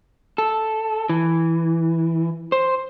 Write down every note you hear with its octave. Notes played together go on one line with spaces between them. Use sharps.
A4
E3
C5